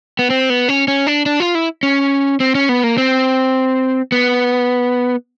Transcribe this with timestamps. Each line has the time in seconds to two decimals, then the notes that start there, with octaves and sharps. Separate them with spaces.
0.19 B3
0.30 C4
0.50 B3
0.69 C#4
0.88 C#4
1.07 D4
1.26 D4
1.40 F4
1.55 E4
1.83 C#4
2.40 C4
2.55 C#4
2.69 B3
2.84 A#3
2.98 C4
4.12 B3